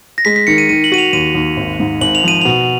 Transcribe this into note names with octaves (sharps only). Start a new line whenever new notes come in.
A#6
G#3 B6
B6
D#3 C#7
D#7
D#3 D#7
F#7
F#4 D#7
F7
D#2 D#7
D#2
G#1
G#2
G#1 F#7
F7
F3 D#7
B2 F7